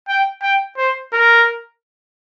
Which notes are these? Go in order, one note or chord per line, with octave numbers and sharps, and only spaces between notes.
G5
G5
C5
A#4